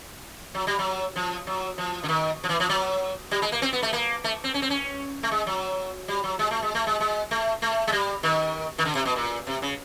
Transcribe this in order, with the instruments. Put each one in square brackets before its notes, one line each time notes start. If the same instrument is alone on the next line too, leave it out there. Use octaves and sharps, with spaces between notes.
[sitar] F#3
G3
F#3
F3
F#3
F3
D3
D#3
F3
E3
F3
F#3
G3
G#3
A#3
C4
B3
A3
A#3
A3
C4
C#4
C4
C#4
A3
G#3
F#3
G3
F#3
G#3
A3
G#3
A3
G#3
G#3
A3
A3
G#3
G3
D#3
D#3
D3
C3
B2
A#2
C3
C#3